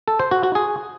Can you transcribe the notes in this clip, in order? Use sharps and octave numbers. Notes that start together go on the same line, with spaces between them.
A4
C5
F#4
F#4
G#4